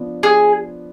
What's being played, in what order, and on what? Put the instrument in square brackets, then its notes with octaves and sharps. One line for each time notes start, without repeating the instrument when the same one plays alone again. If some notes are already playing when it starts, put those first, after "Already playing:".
Already playing: [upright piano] F3 B3 D4
[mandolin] G#4